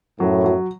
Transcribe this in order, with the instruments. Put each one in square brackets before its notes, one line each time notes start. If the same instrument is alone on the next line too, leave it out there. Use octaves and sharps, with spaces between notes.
[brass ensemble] F#2 A2 [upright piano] F#3
[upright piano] F#3